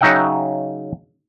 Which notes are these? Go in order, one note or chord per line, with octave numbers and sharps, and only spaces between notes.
C#3 F#3 D#4 E5 F#5 G5